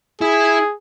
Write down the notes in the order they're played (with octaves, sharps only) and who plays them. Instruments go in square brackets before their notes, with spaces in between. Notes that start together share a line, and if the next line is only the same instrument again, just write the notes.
[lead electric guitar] E4 [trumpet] G#4